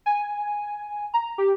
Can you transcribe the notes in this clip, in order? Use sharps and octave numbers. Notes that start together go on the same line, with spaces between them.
G#5
A#5
G4